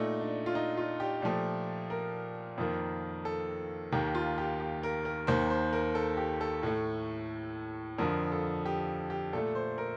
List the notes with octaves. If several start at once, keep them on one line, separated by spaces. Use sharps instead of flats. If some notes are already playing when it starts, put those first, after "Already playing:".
Already playing: A#2 A3 D#4
D4
F4
D#4
F4
G4
A#2 F3 A3
A#4
F2 D#3 A#3
A4
D#2 D#3 A#3 G4
F4
G4
G4
A#4
A#4
D#2 D#3 A#3 C5
C5
A#4
A4
G4
A4
A2 A3
F2 D3 F3 A#4
A4
G4
G4
A#2 A3 A4
C5
A#4